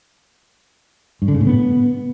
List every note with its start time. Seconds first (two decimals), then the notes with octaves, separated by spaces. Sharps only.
1.22 G2
1.28 D3
1.34 C#3
1.41 A2
1.47 B3